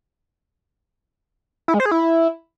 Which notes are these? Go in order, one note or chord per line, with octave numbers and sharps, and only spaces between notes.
E4
G#3
C5
G#4
E4